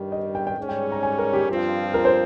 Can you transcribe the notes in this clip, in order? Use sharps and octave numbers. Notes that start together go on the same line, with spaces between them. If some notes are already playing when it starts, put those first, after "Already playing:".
Already playing: G2 D#3 G3
D#5
G5
G5
G#2 G3 C#4 G#4 C#5
G5
A#5
G#5
A#4
G4
G2 F3 C4 F4
A#4
C5